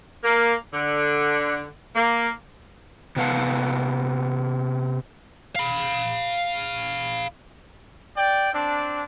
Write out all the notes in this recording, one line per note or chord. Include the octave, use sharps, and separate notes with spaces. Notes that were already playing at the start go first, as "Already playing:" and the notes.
A#3
D3
A#3
C3 B3 B4 F5 F#5 A5
F5 B5
D5 G5
C4 D4